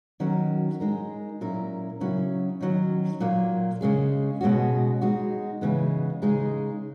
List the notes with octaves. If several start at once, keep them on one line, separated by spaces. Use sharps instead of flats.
D#3 F#3 C#4 F#4 A#4
G#3 D#4 A#4
A#2 F#3 C#4 E4 A#4
C#3 F#3 C#4 E4
D#3 F#3 C#4
A#2 F#3 A#3
C#3 G#3 C#4 G#4
B2 G#3 C#4 F#4
G#3 D#4 F#4
C#3 E3 G#3 B3
C#3 G#3 D#4 G#4